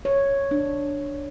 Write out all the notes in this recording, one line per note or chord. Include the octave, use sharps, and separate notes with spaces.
C#5
D4